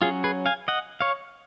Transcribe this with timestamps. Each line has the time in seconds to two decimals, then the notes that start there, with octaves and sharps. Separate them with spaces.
0.02 F#3 C#4 F4 G#4
0.24 G#4 B4
0.46 F5 G#5
0.68 D#5 F#5
1.01 C#5 F5